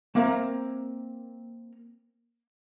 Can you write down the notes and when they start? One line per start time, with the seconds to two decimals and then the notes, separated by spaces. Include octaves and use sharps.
0.15 A#3 C4 A#4 E5 A#5